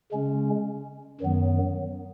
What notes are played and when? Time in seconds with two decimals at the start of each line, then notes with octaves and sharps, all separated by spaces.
0.12 C#3 G#3 C#4
1.21 F#2 D#3 F#3 B3